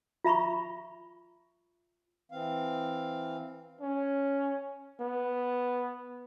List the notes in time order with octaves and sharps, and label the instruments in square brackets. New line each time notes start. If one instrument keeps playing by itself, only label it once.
[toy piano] F4 E5 A#5 B5 C#6
[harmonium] E3 C4 F5
[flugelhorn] C#4
B3